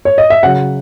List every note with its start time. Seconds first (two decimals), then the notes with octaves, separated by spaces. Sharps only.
0.05 C#5
0.18 D#5
0.30 E5
0.43 C#3 F#3 F#5